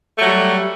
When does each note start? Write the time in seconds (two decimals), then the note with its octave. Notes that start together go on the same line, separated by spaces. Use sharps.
0.17 A3
0.22 F#3
0.27 G3